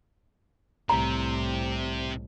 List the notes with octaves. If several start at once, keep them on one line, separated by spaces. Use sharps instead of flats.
C2 A2 C3 A#5